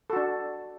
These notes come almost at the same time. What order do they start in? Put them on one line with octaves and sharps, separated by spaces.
A4 F#4 D4